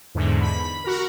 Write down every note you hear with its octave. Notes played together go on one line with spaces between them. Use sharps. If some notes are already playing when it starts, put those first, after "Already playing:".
E2 G#2 D3
B5
F#4 A#4